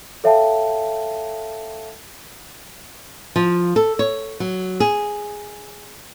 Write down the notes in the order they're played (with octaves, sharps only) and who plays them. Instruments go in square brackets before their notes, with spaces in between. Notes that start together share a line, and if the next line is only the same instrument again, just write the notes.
[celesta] A4 C#5 E5 F5 G5 A5
[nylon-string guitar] F3
A4
C#5
F#3
G#4